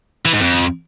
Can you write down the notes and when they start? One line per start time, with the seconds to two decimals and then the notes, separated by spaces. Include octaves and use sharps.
0.25 E3
0.33 G#2
0.41 F2